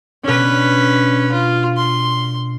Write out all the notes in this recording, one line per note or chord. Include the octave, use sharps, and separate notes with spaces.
B2 C#4 D4 B4
F4
C6